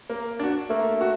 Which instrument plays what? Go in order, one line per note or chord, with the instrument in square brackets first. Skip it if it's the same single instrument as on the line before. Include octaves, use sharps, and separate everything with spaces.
[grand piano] A#3
D4 F#4
[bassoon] A3 [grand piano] A#3
[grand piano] F#4